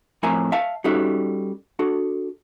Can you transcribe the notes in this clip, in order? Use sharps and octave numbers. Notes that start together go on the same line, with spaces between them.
F2 A2 A#4 E5 G#5 A#5
E5 F5 A5
G3 C#4 D#4 F#4 A4 E5
D4 F#4 A4